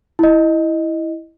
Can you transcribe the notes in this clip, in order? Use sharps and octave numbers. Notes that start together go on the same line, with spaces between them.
E4 D#5